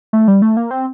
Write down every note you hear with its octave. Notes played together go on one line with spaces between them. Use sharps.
A3
G3
A3
A#3
C4